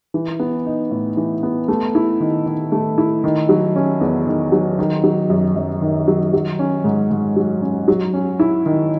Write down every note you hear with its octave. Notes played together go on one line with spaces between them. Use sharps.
E3
B3
D#4
A2
E3
B3
A3
E4
D#3
D#3
A3
E4
D#3
F#3
C#4
E2
D#3
F#3
D#3
F#3
F#2
F#2
D#3
F#3
F#3
C#4
G#2
G#2
F#3
C#4
F#3
C#4
E4
D#3